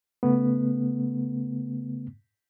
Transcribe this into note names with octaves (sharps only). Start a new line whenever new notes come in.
C#3 A3 B3